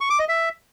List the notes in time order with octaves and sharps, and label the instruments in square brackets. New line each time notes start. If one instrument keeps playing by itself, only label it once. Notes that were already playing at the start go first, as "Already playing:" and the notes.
[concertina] C#6
D6
D#5
E5